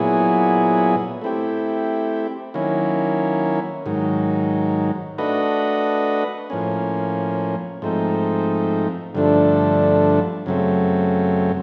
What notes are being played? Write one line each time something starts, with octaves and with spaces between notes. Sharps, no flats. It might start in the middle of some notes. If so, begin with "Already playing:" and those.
Already playing: A#2 F#3 B3 E4 G#4
A3 C4 E4 G4
D#3 F#3 A#3 C#4 E4
G#2 D#3 F#3
A3 D4 F#4 B4 D#5
A2 F3 A#3 C#4
G#2 F3 A3 C4 D#4
G2 D3 F3 A3 D4
F#2 C#3 F#3 A3 C4